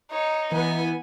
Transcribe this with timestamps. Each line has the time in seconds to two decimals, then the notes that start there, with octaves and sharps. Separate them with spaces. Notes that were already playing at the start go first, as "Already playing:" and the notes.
0.11 D#4 C#5
0.52 E3 B3 G#5